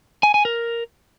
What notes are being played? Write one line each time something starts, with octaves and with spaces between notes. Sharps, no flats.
G#5
G#5
A#4